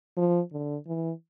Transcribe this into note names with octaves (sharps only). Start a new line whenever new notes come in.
F3
D3
E3